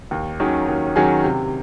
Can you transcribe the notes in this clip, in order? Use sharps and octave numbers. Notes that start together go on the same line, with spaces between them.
D#2
D#3 F#3 C#4 G#4
D#2
D#3 F#3 C#4 G#4
C3